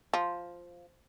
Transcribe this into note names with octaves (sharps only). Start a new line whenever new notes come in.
F3